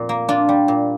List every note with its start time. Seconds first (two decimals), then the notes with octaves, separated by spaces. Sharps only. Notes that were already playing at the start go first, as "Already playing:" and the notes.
Already playing: F2 A#2
0.09 A#3
0.29 D4 F4
0.49 G3
0.68 A#2